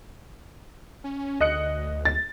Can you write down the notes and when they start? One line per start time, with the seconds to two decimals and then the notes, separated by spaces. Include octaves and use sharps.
1.04 C#4
1.41 D2 D#5 F#6 C#7
2.05 A6